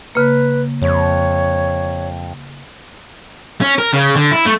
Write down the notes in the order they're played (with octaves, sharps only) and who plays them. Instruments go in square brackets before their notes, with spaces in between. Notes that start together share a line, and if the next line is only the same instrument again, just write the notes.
[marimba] C#3 A#3 [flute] B4
[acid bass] F2 [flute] C#5
[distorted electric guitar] C#4
A#4
C#3
D3
E4
A3